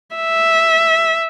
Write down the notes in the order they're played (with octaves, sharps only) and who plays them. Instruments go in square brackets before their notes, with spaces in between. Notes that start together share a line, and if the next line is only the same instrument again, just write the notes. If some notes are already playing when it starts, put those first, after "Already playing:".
[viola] E5